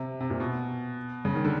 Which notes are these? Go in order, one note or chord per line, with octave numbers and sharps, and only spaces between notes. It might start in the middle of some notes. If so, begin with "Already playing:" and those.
Already playing: C3
C3
A#2
B2
C#3
D#3
D3